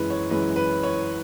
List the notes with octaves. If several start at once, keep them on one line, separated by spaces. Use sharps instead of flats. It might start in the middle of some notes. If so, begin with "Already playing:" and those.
Already playing: F#2 E3 G#3 B4
C#5
F#2 E3 G#3 B4
B4
C#5